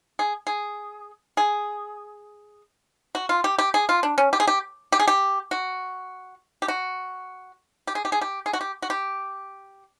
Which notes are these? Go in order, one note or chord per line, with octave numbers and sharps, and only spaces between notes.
G#4
G#4
G#4
F#4
F4
G4
G4
G#4
F4
D4
C#4
G4
G#4
G4
G4
G#4
G4
F#4
G4
F#4
G4
G#4
G4
G#4
G4
G#4
F#4
G4
F#4
G4